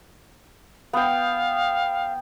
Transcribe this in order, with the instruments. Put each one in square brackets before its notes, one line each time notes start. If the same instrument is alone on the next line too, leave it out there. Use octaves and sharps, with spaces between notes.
[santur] B3 G5 [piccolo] F5